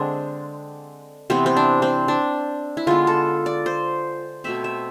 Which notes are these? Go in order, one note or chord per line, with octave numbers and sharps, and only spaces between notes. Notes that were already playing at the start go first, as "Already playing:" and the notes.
Already playing: D3 G#3 C4 D4
C3 E3 B3 C4
C4
D4
C4
D4
E4
D3 G#3 B3 F4
A4
D5
C5
B2 A3 C4 E5
E5